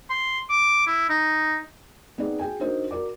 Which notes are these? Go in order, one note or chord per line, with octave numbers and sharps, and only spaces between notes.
C6
D6
E4
D#4
B3 C4 D#4 G#4 D5
F#4 G#4 G5 G#5
D4 D#4 F#4 A#4 C5 D#5
F#4 A#4 D5 D6